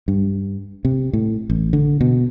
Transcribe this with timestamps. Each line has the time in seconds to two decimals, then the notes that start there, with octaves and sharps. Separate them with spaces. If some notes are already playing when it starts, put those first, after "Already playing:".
0.08 G2
0.85 C3
1.13 A2
1.50 A1
1.73 D3
2.01 B2